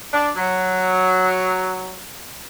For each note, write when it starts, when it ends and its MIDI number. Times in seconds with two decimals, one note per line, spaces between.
0.12 0.30 62
0.36 1.96 54